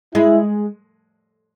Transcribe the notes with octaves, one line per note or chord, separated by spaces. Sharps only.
G#3 E4